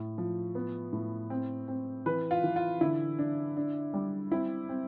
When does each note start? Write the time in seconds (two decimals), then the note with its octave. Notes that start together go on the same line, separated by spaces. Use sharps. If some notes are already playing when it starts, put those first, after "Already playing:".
Already playing: A2
0.18 F3
0.55 B3
0.93 A2
1.30 C4
1.68 C4
2.06 E3 B4
2.31 F4
2.44 E3
2.56 F4
2.81 D3 E4
3.19 D4
3.57 D4
3.94 G3
4.31 C4 E4
4.69 C4